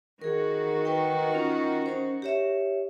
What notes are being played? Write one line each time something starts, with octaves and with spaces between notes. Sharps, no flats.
D#3 F#4 G#4 A#4
B4 G5
C#4 F4
C#4 C5
G4 C#5 E5